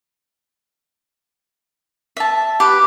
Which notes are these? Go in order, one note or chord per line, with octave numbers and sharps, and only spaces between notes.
E5 A5
G4 B4